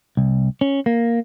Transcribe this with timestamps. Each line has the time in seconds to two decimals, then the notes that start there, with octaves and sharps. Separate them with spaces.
0.17 C2
0.61 C#4
0.86 A#3